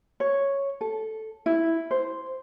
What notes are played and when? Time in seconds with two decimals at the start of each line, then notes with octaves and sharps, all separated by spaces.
0.20 C#5
0.81 A4
1.46 E4
1.91 C5